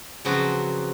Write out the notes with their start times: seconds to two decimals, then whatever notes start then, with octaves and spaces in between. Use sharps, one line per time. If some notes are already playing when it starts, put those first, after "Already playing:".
0.25 C#3 F3 F#3 B3 C4 F#4